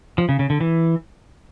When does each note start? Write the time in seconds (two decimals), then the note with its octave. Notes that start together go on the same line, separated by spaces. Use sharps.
0.18 F3
0.29 C#3
0.39 C#3
0.50 D3
0.61 E3